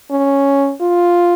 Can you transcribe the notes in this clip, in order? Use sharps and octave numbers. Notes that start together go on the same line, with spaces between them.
C#4
F4